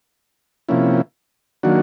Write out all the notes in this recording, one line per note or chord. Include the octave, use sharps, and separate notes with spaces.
C3 F3 A#3 C#4 E4
D#3 F#3 A#3 D4 F#4